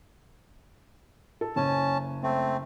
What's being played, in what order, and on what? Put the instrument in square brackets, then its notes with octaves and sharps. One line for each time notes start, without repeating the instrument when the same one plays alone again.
[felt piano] A4
[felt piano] F#1 G#5 [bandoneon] C#4 A5
[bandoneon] A3 C4